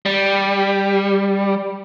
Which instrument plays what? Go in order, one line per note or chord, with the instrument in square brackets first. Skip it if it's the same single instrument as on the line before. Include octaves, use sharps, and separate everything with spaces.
[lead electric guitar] G3